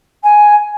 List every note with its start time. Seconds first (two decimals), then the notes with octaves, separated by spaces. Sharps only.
0.23 G#5